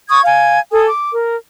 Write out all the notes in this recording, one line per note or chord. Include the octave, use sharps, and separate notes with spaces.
C#6 D#6 G#6
F5 G#5
A4 G#5 D#6
D6
A#4